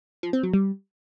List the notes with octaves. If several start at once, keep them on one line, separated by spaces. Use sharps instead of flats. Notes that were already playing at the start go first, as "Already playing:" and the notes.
F3
C4
F#3
G3